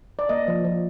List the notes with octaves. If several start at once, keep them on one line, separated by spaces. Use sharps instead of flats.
D5
A#3 D#5
F3
F3